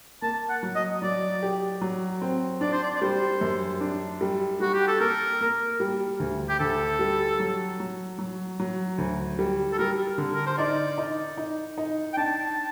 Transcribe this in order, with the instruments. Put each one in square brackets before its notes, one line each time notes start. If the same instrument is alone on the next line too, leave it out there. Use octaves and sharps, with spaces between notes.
[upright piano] A#3 [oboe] A5
[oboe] F#5
[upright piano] F#3
[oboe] D#5
[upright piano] F#3 [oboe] D5
[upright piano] G4
F#3
C4
[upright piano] D4 [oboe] D5
[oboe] C5
D5
D5
[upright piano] G3 [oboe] C5
[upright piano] F#2
D4
G3
[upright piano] G3 [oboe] F#4
[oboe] G4
A4
[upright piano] A#3 [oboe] A#4
[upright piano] A#3
G3
D2
[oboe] G4
[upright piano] D2 [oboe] A4
[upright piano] G3
F#3
F#3
F#3
F#3
D2
G3
[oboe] A4
[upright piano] G3 [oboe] A#4
[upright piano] D3
[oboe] A#4
C5
[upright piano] D#4 [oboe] D5
[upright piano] D#4
D#4
D#4
[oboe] G5
[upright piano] D4 [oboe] A5